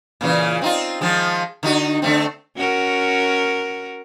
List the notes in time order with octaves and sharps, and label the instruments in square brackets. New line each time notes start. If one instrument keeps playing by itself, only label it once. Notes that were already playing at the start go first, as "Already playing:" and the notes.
[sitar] A#2 C#3 E3
C4 D#4 F4
D#3 F3 G#3
D3 D#4 F#4
D3 A3 C4
[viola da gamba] C#4 F#4 A#4